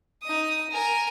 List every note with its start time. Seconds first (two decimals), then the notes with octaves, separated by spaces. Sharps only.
0.22 D#4 D#6
0.71 A#4 G#5